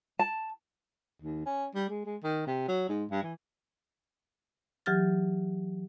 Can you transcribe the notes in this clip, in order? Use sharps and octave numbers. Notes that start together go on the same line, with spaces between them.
A5
D#2
C#4
G3
G#3
G#3
D#3
C3
F#3
G#2
G2
E3
E3 F#3 G4 F6 A6